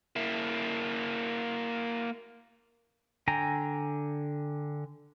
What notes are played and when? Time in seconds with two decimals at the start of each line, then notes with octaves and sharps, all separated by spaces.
0.16 A#3 E4
3.28 D3 G5 G#5 A#5